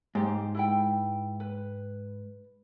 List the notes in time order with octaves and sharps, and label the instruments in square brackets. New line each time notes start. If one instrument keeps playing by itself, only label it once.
[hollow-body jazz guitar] G#2 [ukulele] G4 C5
[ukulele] E4 B4 G5
B4